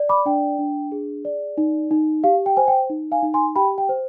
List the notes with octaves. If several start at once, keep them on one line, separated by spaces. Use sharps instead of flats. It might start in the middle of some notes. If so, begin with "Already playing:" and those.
Already playing: D5
B5 D6
D4 G5
D4
G#4
D5
D#4
D#4
G4 F5
G5
C5 G#5
G5
D#4
F5 G#5
D#4
G#5 C6
G4 G5 B5
G5
C5